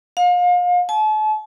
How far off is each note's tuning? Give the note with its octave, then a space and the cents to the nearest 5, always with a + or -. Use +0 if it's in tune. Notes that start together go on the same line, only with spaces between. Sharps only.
F5 +35
A5 -40